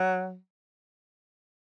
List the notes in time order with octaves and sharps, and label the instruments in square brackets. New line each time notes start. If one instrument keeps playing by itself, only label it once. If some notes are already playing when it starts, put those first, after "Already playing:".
Already playing: [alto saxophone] F#3